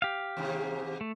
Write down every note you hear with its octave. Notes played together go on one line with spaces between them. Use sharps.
G4 F5
D#2 G#2 C3
A3